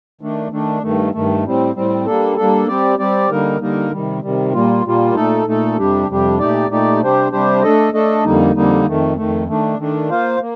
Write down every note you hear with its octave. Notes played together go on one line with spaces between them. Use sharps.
D#3 A3 D4
D#3 A3 D4
G2 D#3 A3
G2 D#3 A3
A2 G3 C4
A2 G3 C4
G3 A#3 D4 A4
G3 A#3 D4 A4
G3 C4 G4 D5
G3 C4 G4 D5
D3 G3 A#3 D#4 A#4
D3 G3 A#3 D#4 A#4
C3 D#3 G3
C3 D#3 G3
A#2 G3 A#3 F4
A#2 G3 A#3 F4
A#2 A3 D#4 A4
A#2 A3 D#4 A4
F2 C3 G3 D4 G4
F2 C3 G3 D4 G4
A#2 A3 D#4 G4 D5
A#2 A3 D#4 G4 D5
C3 G3 D4 G4 C5
C3 G3 D4 G4 C5
A3 D4 A4 D#5
A3 D4 A4 D#5
F2 D3 G3 A#3 D#4
F2 D3 G3 A#3 D#4
F2 D#3 A3
F2 D#3 A3
D#3 A3 D4
D#3 A3 D4
A#3 F4 C5 F5
A#3